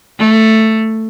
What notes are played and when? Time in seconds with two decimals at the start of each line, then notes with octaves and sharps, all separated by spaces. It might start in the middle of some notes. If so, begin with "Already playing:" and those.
0.19 A3